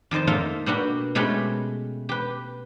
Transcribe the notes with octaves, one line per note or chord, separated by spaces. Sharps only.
F2 D#3 C5 D#5 A5
A#3 D#4 F4 A4 E5 F5
B2 A#3 B3 D4 F#4 G4
B2 G#3 A3 C#4 G4 B4
G4 B4